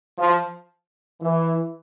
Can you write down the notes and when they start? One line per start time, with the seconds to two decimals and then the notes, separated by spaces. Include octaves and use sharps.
0.18 F3
1.21 E3